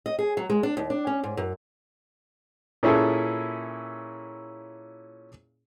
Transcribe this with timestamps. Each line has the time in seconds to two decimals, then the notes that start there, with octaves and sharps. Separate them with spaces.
0.06 D#5
0.19 G#4
0.37 F#3
0.50 G#3
0.63 D4
0.77 D#2
0.90 D4
1.07 C#4
1.24 G#2
1.37 F#2
2.83 A#2 C#4 E4 G#4 A4